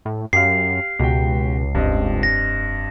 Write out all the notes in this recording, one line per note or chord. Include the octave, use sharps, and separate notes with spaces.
A2
F#2 G4 F5 C7
C#2 B2 F#4 G4 G5
F1 G2 C4 D#5
A#6